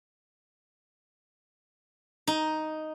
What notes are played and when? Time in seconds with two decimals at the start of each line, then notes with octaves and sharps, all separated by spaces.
2.27 D#4